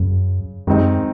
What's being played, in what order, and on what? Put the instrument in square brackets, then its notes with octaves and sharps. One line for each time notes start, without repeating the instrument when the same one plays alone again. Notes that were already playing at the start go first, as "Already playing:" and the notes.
Already playing: [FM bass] F#2 [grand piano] C#3
[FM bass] F#2 [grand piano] D#3 G#3 C4 D#4